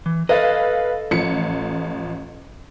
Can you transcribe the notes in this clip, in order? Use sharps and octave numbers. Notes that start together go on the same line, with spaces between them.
E3
A4 B4 D#5 F5
A1 F3 C#7